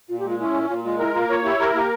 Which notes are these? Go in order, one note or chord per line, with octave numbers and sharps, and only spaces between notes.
A#2 F4
G4
G#3 F4
C#4 E4
A#2
A#2 F4
G#3 F4
E4 A#4
A#3 F4
F4 C#5
E4 G4
G4 A#4
A#3 G4